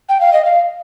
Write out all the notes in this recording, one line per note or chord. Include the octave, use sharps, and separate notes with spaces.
G5
F5
D#5
F5